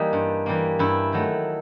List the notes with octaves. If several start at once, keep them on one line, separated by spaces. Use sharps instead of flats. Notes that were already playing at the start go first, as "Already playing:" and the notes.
Already playing: E3 G3 A#3 D#4
G2
E3 G3 A#3
G2 E4
D#3 F#3 A3